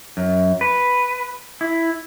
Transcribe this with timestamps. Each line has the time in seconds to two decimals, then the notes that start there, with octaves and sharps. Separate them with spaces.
0.17 F#2
0.61 B4
1.61 E4